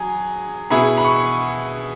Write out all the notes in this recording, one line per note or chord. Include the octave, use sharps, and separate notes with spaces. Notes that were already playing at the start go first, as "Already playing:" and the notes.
Already playing: F#3 G#4 G#5
B2 B3 E4 G#4 B5
B5
C#6